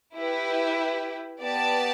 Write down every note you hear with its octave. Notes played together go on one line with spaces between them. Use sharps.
E4 G4 B4
B3 G4 D5 A5